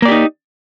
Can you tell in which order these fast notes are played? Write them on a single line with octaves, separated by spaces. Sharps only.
A#3 D5 G4 D#4